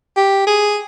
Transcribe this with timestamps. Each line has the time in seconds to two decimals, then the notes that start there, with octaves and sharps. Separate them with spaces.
0.17 G4
0.47 G#4